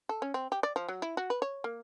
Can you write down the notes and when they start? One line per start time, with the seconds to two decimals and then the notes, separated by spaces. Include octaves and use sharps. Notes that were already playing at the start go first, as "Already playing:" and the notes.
0.09 A4
0.22 C#4
0.34 C4
0.52 G4
0.63 D5
0.76 F3
0.88 F#3
1.02 E4
1.17 F#4
1.30 B4
1.42 C#5
1.64 A#3